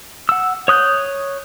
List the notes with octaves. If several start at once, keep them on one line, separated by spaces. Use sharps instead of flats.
F#5 E6
C#5 D#6 F#6 G6